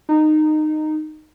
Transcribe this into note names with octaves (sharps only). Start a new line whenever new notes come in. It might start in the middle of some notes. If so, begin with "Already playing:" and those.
D#4